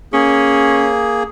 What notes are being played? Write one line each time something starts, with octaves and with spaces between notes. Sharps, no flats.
A#3 C#4 G#4